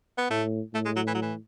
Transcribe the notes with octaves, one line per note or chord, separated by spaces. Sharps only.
B3
A2 A3
A2 A3
G#3
F#3
E3
F#3
E3